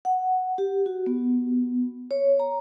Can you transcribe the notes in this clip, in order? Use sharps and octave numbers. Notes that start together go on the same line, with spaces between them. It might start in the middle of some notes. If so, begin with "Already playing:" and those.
F#5
G4
F#4
B3
C#5
A#5